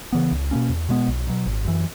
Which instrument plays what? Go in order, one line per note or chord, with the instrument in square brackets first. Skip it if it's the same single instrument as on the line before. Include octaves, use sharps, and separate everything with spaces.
[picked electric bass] C#3 E3 B3
C#2
B2 A#3 C#4
E2
B2 G#3 B3
B1
B2 F#3
G#1
F#2 E3